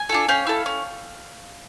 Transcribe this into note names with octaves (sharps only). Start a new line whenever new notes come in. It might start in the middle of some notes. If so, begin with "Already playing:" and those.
Already playing: G#5
D4 F4 A4
C#4 F5 G5
E4 A4
C#4